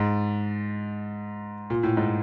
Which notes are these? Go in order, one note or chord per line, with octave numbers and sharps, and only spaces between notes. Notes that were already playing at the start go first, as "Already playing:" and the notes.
Already playing: G#2
A#2
A2
G#2